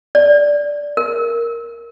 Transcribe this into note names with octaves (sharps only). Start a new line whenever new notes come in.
D5
A#4